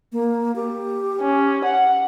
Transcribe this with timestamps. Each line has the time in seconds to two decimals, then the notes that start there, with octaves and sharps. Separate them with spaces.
0.13 A#3
0.56 G4
1.20 C#4
1.64 F#5